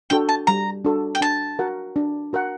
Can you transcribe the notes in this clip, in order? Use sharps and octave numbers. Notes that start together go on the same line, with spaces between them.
D4 F#4 A4 G5
A5
G3 A#5
D4 F#4 A4
G5
D4 A5
F#4 A#4 F#5
D4
F#4 A#4 F#5